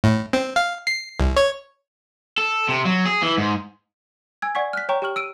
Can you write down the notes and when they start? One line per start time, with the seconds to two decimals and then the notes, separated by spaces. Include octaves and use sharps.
0.04 A2
0.33 C4
0.56 F5
0.87 C7
1.20 C2
1.37 C#5
2.38 A4
2.69 C3
2.85 F#3
3.06 G#4
3.22 E3
3.38 G#2
4.42 G#5 E6 G#6
4.55 D5 F#5 G#5 C#6 G#6 B6
4.73 F6 F#6 B6
4.89 C#5 G5 A#5 C#6
5.02 G4 G5 C#6 F6 F#7
5.16 E6 D7 D#7